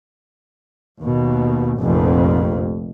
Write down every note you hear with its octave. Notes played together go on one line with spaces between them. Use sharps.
D#2 B2
F1 A#1 F2